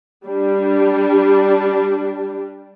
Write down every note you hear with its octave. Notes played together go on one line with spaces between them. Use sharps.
G3 D4